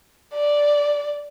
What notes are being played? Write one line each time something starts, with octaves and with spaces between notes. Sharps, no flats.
D5